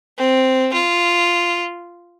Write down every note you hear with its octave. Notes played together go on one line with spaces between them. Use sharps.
C4
F4